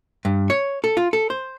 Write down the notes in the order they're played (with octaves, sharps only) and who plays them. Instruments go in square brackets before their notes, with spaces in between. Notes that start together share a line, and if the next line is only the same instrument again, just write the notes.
[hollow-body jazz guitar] G2
C#5
A4
F4
A4
C5